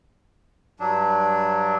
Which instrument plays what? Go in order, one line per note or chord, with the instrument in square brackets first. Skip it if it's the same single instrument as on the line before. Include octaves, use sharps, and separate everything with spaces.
[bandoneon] G2 F#3 D4